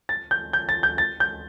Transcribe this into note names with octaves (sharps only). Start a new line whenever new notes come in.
A6
G6
G6
A6
G6
A6
G6